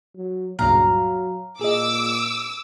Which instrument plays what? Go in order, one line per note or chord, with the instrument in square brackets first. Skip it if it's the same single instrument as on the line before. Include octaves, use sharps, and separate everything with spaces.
[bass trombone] F#3
[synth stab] C#2 G2 A#2 [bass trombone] F#3 [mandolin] F5 A#5
[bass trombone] A#2 [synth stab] G#4 D#5 [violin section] D6 E6